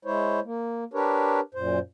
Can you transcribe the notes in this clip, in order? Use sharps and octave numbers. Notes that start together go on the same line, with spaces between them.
G#3 E4 C5 C#5
A#3
D4 G4 A#4 B4 C#5
F#2 A#2 C5